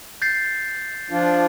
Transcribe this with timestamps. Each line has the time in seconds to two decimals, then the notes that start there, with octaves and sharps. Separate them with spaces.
0.22 G6 A6 C7
1.10 F3 D4 F4